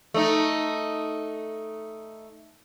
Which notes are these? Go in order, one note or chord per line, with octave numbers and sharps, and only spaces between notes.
A3 D#4